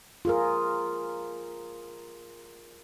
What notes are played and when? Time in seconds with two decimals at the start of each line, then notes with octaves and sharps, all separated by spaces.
0.25 F4 G#4 A#4